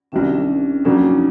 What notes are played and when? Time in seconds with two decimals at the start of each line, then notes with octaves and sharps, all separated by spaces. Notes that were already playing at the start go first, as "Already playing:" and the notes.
0.12 C2 C3 D#3 C#4
0.23 D4
0.34 C#4
0.85 F2 C#3 F#3 A#3 C#4 D4
1.03 D#4